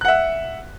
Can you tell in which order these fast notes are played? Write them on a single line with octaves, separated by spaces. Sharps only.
F#6 F#5 E5